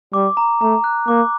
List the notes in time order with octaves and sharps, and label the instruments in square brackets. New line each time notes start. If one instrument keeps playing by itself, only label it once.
[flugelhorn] G3 [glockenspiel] D6
[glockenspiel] A#5
[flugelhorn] A3 [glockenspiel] A#5
[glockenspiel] F#6
[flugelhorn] A#3 [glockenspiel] D6